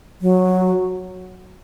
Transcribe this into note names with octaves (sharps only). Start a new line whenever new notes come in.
F#3